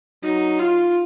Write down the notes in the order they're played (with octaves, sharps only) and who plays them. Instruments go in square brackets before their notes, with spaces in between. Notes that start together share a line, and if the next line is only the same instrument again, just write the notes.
[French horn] F#3 [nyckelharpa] D#4
[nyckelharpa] F4